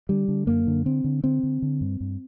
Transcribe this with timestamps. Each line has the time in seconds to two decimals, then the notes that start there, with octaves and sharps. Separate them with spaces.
0.09 D3 G3
0.28 D3
0.47 F#2 A#3
0.67 D3
0.85 D3 C4
1.04 D3
1.24 D3 C4
1.43 D3
1.62 D3
1.81 G2
2.01 G2